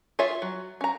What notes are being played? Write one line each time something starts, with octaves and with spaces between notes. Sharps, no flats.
F4 G#4 C#5 E5
F#3
C#4 A#5